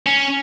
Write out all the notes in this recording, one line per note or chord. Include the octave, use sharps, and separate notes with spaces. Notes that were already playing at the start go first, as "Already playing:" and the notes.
C#4